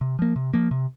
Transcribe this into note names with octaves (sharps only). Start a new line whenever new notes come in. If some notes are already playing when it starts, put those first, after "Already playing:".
C3
F3 A#3
C3
F3 A#3
C3